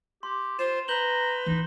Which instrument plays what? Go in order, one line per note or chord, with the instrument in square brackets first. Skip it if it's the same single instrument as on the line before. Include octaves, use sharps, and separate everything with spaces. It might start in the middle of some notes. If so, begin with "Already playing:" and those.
[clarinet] G4 [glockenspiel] C6
[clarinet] F4 [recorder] C5 [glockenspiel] E7
[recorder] B4 [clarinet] A#5 [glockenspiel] G6 F#7 G7
[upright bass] E3 F4 [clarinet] D#4